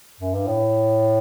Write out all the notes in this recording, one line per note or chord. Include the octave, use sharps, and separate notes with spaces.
F#2
G2
A2